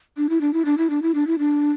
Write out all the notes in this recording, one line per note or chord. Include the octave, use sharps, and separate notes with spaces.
D4
E4
D4
E4
D4
E4
D4
E4
D4
E4
D4